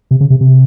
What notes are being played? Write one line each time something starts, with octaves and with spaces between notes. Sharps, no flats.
C3
C#3
C3
C3